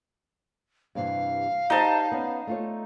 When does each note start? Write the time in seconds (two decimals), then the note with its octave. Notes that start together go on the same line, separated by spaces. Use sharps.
0.95 G2 C3 E3 F5
1.70 D#4 G4 C5 A5
2.12 B3 C#4
2.47 A3 F4 C#5